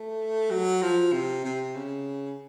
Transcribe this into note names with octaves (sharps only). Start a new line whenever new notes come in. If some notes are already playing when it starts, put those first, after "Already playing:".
Already playing: A3
F#3
F3
C3
C3
C#3